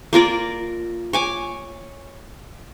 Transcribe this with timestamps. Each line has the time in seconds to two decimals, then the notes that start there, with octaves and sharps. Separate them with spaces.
0.13 A#3 F4 A#4 D5
1.13 C#5 G#5 D6